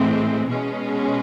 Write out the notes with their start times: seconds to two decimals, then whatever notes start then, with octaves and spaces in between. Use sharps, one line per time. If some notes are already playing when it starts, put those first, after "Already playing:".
Already playing: A2 E3 G#3 C4
0.49 B2 G#3 C#4